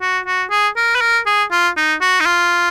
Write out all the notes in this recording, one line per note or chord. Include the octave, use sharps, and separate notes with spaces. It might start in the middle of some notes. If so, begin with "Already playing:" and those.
F#4
F#4
G#4
A#4
B4
A#4
G#4
F4
D#4
F#4
D#4
F4